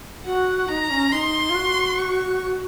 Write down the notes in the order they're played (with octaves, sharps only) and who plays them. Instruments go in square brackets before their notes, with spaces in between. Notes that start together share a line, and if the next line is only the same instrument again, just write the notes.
[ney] F#4 [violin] F#5
[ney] D#4 [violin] A#5
[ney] C#4
[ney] D#4 [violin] C6
[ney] F4
F#4
[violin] C#6